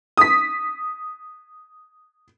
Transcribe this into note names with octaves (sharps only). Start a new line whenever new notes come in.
D#6 B6